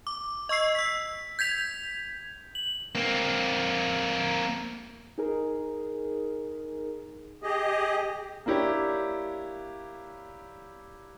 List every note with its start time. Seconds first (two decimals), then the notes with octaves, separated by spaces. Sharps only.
0.07 D6
0.49 D#5 C#6 E6 C7
0.75 E6 B6
1.39 G6 G#6 B6 F7
2.55 F#7
2.95 A#3 C4
5.18 D#4 G#4 A#4
7.43 G4 G#4 D#5
8.46 A#3 D4 E4 G4 C#5